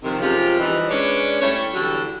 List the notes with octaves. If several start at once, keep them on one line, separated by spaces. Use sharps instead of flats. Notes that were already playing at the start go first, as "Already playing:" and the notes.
C3 D#3 F3
F#2 C3 F3 G#3 F4 G4
E3 F3 G3 D#4
G#3 C#4 D4 B4 C#5 D5
G3 A3 C#4 E4 C#5
E2 D3 F#3 G3